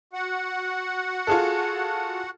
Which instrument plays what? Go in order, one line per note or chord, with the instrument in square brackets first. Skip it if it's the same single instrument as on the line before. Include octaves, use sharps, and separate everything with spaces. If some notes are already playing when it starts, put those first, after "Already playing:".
[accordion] F#4 F#5
[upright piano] F4 G#4 A4